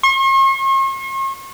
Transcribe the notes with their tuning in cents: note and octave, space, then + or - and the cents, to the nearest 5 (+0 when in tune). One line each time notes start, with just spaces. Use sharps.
C#6 -45